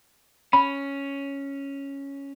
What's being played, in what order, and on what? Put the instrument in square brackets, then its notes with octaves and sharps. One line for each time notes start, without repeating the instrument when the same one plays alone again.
[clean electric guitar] C#4 [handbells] B5